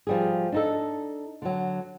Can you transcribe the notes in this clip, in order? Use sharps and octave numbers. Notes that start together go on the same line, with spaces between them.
F3 G3 G#4
D4 D#4 A4
D3 F#3